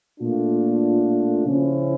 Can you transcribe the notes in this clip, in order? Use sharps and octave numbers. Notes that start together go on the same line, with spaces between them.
A#2 A3 D4 F4
C#3 F3 C#4 E4